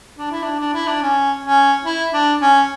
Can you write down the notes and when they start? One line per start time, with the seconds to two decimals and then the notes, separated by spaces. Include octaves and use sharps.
0.18 D4
0.31 E4
0.43 D4
0.60 D4
0.73 E4
0.87 D4
1.02 C#4
1.43 C#4
1.85 E4
2.14 D4
2.42 C#4